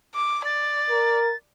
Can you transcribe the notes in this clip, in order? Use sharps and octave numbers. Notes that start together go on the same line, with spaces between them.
D6
D5 A6
A#4